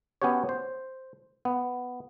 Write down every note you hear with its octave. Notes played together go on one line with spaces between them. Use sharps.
B3 C#4 F#4 G4 C#5
C5
B3